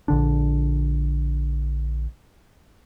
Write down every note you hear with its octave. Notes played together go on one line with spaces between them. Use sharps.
A#1 D3 D4